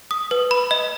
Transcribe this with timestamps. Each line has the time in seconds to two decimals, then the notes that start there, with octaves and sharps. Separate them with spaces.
0.11 D#6
0.31 B4
0.51 B5
0.71 D#5